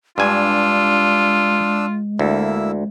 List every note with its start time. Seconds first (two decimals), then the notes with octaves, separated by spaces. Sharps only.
0.18 G2 G#3 D4 F4 G#5 E6
2.19 D2 A#3 E4 E6